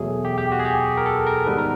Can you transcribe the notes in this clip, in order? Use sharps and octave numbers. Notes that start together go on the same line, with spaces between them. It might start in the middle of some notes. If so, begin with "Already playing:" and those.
Already playing: E2 B2 F#3 A3 G#4
G4
G4
F#4
G#4
G4
A#4
A4
A#4
G#2 D#3 G3 B3 B4
A#4